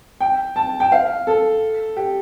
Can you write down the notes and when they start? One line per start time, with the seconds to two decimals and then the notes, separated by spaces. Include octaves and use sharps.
0.21 G5
0.56 A5
0.80 G5
0.92 F5
1.27 A4
1.96 G4